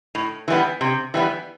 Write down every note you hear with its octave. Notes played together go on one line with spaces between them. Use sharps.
A2
E3 G3 B3
C3
E3 G3 B3